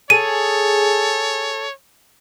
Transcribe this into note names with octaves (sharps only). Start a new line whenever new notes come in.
G#4 A4 C#5 D#7